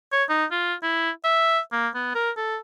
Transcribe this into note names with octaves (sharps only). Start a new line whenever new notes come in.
C#5
D#4
F4
E4
E5
A#3
B3
A#4
A4